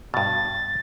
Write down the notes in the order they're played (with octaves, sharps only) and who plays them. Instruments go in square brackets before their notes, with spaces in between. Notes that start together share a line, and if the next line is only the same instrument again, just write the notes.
[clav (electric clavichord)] G2 B2 [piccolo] A6